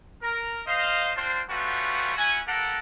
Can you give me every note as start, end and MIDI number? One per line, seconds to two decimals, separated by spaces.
0.22 0.60 70
0.67 1.11 72
0.67 1.11 75
0.67 1.11 77
1.16 1.41 60
1.16 1.41 62
1.16 1.41 65
1.16 1.41 72
1.49 2.14 55
1.49 2.14 57
1.49 2.14 59
1.49 2.14 61
1.49 2.14 65
1.49 2.14 66
2.16 2.41 61
2.16 2.41 64
2.16 2.41 66
2.16 2.41 78
2.16 2.41 80
2.47 2.79 58
2.47 2.79 67
2.47 2.79 69
2.47 2.79 70
2.47 2.79 78